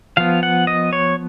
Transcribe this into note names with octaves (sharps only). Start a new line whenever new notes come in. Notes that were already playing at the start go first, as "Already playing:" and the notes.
F3 B3 F5
F#5
D#5
C#5